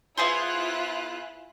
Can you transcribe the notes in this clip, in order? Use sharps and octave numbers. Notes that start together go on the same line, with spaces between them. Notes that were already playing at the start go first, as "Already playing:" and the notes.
B3 E4 F4 G#4 C5 F#6